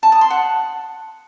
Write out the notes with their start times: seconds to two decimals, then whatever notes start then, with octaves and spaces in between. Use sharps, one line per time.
0.03 A5
0.12 D#6
0.21 C6
0.30 F#5